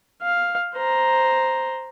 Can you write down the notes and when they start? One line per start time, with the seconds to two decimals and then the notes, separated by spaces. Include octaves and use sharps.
0.23 F5
0.76 C5 A#5